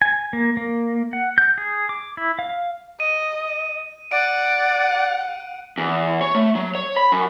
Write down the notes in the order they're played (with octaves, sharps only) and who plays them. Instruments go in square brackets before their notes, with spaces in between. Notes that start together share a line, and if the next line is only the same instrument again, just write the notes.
[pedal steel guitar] G#5
A#3
A#3
F#5
G6
G#4
D6
E4
F5
[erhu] D#5 [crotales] D#7
[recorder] D5 [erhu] F#5 [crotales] D7
[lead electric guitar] E2
C#5
A3
F#3
C#5
B5
F#2